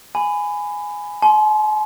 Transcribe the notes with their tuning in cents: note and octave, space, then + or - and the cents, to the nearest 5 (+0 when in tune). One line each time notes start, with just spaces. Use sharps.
G#5 +0 B5 +20
G#5 +45 C6 +0